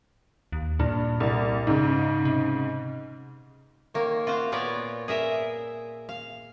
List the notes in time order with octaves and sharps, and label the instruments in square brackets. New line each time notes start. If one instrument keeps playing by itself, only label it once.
[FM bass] D#2
[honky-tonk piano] G2 [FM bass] A#2
[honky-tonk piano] C2
G#2 C#3
[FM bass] C3
[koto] D#3 A#3 C#5
F4 F#4 C5 F5
A#2 B3 F4 C#5 D5
G#4 A#4 E5
F5